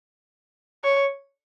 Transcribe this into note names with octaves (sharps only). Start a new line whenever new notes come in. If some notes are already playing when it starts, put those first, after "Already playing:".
C#5